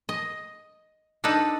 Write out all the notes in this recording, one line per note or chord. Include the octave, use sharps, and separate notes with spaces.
D#5
D4 D#4 A4 B4